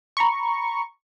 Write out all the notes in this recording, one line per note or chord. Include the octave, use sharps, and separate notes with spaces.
A#5 B5 C#6